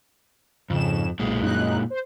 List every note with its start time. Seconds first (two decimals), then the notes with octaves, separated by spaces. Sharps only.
0.70 F2 G#2 C#3 E7
1.19 B1 A#2 G#3
1.41 F#2 D#4 F#6
1.90 C5